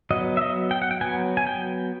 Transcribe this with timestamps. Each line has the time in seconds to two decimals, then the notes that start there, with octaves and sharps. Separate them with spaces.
0.11 F#3 B3 D#5
0.37 E5
0.42 D#5
0.71 G5
0.82 F#5
0.91 G5
1.01 F#3 B3 G#5
1.37 G#5
1.47 G5